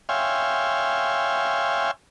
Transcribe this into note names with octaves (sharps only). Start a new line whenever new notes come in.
C#5 E5 F5 G5 G#5 C6